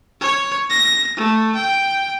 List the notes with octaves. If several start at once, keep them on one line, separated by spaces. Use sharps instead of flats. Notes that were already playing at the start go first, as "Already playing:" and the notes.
C#5
A#6
A3
G5